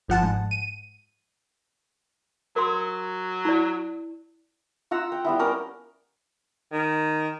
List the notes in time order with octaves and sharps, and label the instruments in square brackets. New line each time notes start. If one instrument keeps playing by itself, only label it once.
[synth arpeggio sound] G1 F3 F#5 A5
G#2
D#7
[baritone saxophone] F#3 [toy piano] A#4 C6
[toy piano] E4 D5
[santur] F4 F#5 A#5 E6
G5
G3 B3 E4
C#4 A#4 D5 A#5
[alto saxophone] D#3